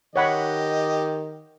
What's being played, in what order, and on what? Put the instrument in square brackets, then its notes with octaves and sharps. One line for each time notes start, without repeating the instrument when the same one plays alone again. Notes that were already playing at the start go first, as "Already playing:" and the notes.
[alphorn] D#3 [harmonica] G4 D#5 [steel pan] C#5 F#5 B5